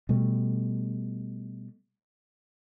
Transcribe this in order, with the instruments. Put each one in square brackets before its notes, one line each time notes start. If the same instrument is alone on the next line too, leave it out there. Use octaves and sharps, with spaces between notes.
[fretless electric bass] B2 G3 A3